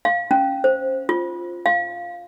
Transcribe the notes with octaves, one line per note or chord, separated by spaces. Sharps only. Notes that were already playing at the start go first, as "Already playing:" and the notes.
F5
C#4
C5
F4
F5